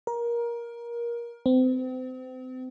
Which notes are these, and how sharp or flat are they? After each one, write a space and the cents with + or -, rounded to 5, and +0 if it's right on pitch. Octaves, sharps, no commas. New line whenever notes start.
A#4 +20
C4 -35